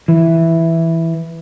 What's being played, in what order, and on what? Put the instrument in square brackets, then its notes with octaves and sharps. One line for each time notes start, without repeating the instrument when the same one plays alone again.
[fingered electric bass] E3